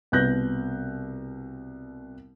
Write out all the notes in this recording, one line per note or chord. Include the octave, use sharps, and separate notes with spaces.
C2 B2 B4 F#6 G6 A#6